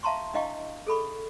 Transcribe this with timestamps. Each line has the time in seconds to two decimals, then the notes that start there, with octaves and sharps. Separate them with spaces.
0.03 E5 F5 A5 A#5 C6 C#6
0.34 D4 E4 D#5 F5 G5 C#6
0.87 G#4 A4 B5 C#6